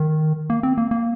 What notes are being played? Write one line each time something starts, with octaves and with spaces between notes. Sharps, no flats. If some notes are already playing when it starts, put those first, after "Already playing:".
Already playing: D#3
A#3
C4
A#3
A#3